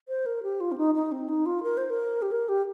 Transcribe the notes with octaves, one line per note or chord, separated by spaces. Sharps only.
C5
A#4
G4
F4
C4
D#4
D#4
C4
D#4
F4
A#4
C5
A#4
G4
A#4
G4